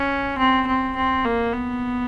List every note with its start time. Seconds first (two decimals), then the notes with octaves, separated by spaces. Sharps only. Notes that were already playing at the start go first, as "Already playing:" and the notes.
Already playing: C#4
0.38 C4
0.67 C4
0.96 C4
1.25 A#3
1.53 B3